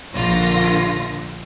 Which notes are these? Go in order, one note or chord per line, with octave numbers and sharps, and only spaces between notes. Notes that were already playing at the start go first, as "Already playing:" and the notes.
A#1 D3 F4 A#6